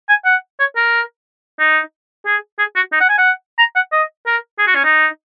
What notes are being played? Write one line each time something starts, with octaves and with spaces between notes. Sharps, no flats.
G#5
F#5
C#5
A#4
D#4
G#4
G#4
F#4
D#4
F#5
G#5
F#5
A#5
F#5
D#5
A#4
G#4
F#4
C#4
D#4